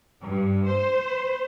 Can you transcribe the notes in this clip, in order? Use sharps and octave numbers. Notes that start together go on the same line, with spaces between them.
G2
C5